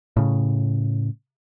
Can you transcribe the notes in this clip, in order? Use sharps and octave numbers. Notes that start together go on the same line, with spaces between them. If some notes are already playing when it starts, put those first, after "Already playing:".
A2 C#3